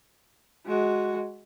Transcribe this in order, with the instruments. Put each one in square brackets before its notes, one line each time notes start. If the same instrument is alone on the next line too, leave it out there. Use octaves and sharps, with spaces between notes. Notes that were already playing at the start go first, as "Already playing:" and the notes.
[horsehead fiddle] G#3 F#4